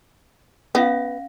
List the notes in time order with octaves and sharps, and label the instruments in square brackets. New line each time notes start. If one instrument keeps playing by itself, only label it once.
[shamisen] B3 [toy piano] C#4 E5 F5